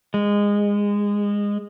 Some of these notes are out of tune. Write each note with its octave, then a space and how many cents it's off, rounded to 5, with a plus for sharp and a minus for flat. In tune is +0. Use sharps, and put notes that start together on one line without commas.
G#3 -20